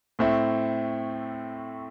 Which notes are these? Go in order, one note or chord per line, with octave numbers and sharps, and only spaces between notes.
A2 A3 C4 E4